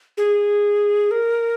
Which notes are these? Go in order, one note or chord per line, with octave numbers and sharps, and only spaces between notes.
G#4
A#4